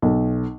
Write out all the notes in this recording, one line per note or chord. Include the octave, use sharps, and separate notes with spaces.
B1